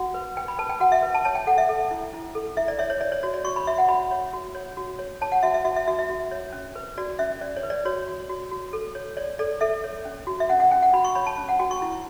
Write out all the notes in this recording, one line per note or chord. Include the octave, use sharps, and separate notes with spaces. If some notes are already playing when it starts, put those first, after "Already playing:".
Already playing: F#4 F#5
B4
B4 G5
B5
B4 A5
G5
F#4 F#5
E5
B4
A5
C#5 A5
G5
A4 F#5
E5
A4
E4
E4
A4
E4 E5
D5
C#5 E5
C#5
C#5 D5
C#5
F#4 C#5
D5
F#4 C#6
B5
F#4 E5
F#5
F#4 B5
C#5
F#4
C#5
F#4
C#5
C#5 A5
F#5
F#4 E5
E5
F#4 E5
E5
F#4 E5
E5
F#4
C#5
C#4
B4
F#4 D5
C#4 E5
C#4 D5
C#5
B4
D5
F#4 C#5
F#4
F#4
F#4
A4
C#5
C#5 D5
A4 D5
A4 E5
C#5
C#4
F#4
E5
C#4 F#5
F#5
C#4 G5
F#5
F#4 B5
C#6
C#5 B5
A5
C#4
F#5
F#4 G5
C#6
E4